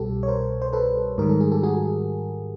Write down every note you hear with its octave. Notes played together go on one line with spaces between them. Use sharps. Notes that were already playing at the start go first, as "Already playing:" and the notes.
Already playing: C2 B2 G3 G4 A4
C#5
A#4 C5
C5
A4 B4
G#2 D#3 G3 A#4
A4
G#4
G4 A4
F#4 G#4